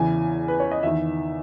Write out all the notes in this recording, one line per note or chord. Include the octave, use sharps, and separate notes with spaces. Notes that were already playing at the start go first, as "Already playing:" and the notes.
Already playing: E2 C#3 E3 G#5
B4
C#5
D#5
E2 D#3 E5